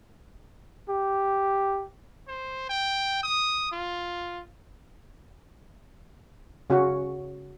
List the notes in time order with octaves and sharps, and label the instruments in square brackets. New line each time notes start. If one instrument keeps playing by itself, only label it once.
[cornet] G4
[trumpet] C5
G5
D#6
F4
[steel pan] C#3 C#4 F#4